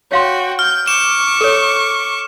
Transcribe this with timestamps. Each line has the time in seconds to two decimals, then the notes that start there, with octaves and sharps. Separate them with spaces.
0.11 F#4 C#5 F5 G5 C6
0.59 F6 G6
0.88 C#6 D6 E7
1.41 A4 C#5